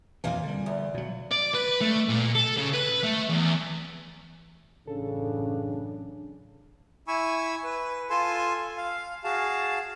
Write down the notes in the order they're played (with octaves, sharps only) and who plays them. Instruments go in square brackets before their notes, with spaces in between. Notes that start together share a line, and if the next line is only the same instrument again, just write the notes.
[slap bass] F2 B2 E3 [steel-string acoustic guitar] A#3 F4 G#5
[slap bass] D3 G3
[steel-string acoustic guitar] E2
[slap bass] B2 F#3
[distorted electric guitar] D5
B4
A3
A#2
A4
C#3
B4
A3
E2
[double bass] A1 F#2 [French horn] C#3 [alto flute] D4 [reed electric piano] A4
[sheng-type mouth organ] E4 G#5 B5 C#6 E6
B4
F4 A4 G#5 A5 C6
F5
F#4 G#4 F5 A5